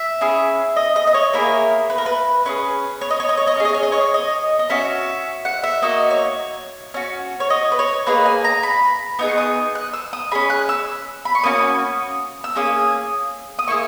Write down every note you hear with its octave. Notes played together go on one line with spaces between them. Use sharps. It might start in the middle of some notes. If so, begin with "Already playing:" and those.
Already playing: E5
C#4 E4 G#4
D#5
D#5
D#5
C#5
A#3 E4 G#4 A#4
B4
A#4
B4
C#4 E4 G#4 B4
C#5
D#5
C#5
D#5
C#5
D#5
C#4 G#4 C#5
D#5
C#5
D#5
C#5
D#5
D#5
C#4 F#4 E5
F#5
E5
A#3 D#4 F#4 D#5
C#5
C#4 F#4
C#5
D#5
B4
C#5
A#3 D#4 G#4 B4
G#5
A#5
B5
B3 D#4 G#4 D#6
C#6
D#6
F#6
E6
D#6
C#4 G#4 B5
F#6
E6
B5
C#6
A#3 C#4 F#4 D#6
E6
A#3 C#4 G#4 D#6
D#6
A#3 E4 G#4 C#6